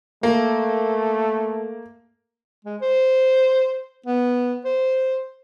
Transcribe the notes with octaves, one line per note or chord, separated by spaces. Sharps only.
A3 A#3
G#3
C5
B3
C5